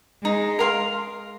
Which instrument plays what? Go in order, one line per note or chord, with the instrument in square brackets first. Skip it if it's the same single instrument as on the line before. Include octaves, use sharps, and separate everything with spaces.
[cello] G#3 [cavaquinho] D#4
[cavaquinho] A#4 F5 C6